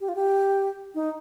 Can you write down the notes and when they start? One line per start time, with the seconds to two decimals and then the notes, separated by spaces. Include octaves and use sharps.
0.01 G4
0.09 F4
0.15 G4
0.95 D#4